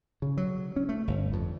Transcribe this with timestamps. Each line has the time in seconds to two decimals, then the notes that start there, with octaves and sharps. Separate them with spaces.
0.22 C#3
0.37 F#3
0.76 C#4
0.89 A3
1.08 G1
1.33 F2